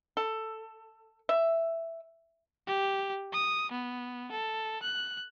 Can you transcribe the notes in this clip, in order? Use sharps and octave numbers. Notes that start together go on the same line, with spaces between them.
A4
E5
G4
D#6
B3
A4
F#6